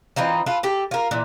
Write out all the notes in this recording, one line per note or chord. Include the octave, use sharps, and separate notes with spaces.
E3 C4 D#4 F4
F4 A4 B4
G4 A4
F4 A#4
A#2 E3